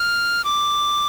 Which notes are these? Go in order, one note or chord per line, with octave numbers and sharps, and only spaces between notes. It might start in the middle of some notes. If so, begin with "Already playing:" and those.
Already playing: F6
D6